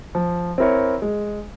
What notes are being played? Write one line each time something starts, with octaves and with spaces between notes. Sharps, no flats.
F3
C4 E4 A#4 C#5
G#3